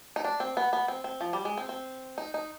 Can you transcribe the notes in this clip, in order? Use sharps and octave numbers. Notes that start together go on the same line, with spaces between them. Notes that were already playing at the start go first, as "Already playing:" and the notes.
D#4
D4
C4
B3
B3
C4
C4
F3
G3
G#3
C4
C4
D#4
D#4